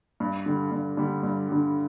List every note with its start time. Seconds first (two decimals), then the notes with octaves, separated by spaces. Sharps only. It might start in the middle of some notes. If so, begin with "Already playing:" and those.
0.20 G2
0.46 D3 G3
0.71 G2
0.97 D3 G3
1.23 G2
1.49 D3 G3